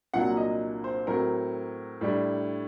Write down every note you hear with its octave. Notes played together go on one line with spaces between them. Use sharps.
C2 A#2 F#3 A#3 D4 F#5
D#5
C5
A2 F#3 C4 A#4
A2 G3 D4